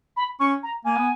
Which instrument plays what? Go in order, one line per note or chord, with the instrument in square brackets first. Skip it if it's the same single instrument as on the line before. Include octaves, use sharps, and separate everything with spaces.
[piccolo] B5
[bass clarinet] C#4 [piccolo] C#6
[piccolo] A#5
[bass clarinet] A#3 [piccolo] G#5
[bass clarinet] B3